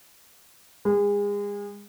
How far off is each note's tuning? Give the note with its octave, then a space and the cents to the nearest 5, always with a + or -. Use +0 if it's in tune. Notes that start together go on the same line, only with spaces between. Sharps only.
G#3 -35